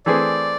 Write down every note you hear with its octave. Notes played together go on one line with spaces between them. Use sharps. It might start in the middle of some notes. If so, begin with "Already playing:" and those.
E3 A3 C4 G#4 D5